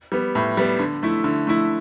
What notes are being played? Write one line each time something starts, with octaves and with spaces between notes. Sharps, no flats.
G3 B3
A2
G3 B3
D3
A3 E4
D3
A3 E4